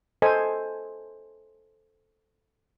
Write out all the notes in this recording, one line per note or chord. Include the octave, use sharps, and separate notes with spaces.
A4 C5 D#5 G#5